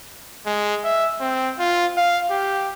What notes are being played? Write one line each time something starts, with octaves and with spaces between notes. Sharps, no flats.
G#3
E5
C4
F4
F5
G4